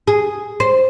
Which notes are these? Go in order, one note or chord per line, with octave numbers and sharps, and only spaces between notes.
G#4
C5